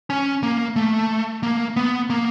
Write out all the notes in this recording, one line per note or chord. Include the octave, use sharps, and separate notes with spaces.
C#4
A#3
A3
A#3
B3
A#3